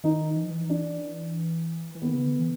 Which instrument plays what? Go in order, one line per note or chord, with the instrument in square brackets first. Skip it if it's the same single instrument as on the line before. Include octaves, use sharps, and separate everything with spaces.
[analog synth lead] D#3 [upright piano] D#4
[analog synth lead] E3
F3
E3
[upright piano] D4
[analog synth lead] E3
[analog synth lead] D#3 [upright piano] B3
[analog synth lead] C#3
D3
E3